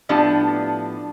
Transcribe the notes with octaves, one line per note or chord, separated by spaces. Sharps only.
A2 F3 B3 D4 G4